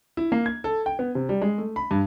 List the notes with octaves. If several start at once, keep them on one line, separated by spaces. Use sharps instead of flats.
E4
A#3
G#6
A4
G5
B3
C3
G3
G#3
A3
B5
G2